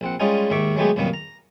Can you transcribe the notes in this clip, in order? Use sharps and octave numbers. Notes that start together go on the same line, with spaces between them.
A#1 C4 F#5
G3 G#3 C#4 D#4 F4 G#4
D#2 G#2 D#3 E5 C#6 D6
F#3 G#3 A3 B3 G4 G#4
C2 F#2 A#2 D#3 A#3 B3
A#5